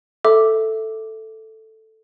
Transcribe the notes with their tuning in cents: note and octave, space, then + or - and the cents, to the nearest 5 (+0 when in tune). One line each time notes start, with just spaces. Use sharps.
A4 +0 E5 +0 D6 +0